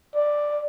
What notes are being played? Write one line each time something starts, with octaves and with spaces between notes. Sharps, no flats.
D5